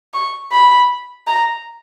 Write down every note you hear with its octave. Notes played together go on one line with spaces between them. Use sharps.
C#6
B5
A#5